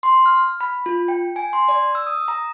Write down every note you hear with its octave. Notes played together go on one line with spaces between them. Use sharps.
C6
F6
B5
F4
G5
G#5
C6
D5
E6
D#6
A#5